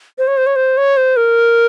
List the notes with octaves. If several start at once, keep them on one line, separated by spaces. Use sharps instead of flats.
C5
C#5
C5
C#5
C5
C#5
C5
A#4